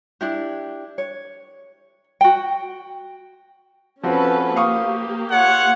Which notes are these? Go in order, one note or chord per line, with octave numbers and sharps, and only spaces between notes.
D4 E4 G4
C#5
F#4 G5
F3 C4 C#4 F#4 A4 B4
A#3 G4 F5 C#6 D#6
F4 C#5 F#5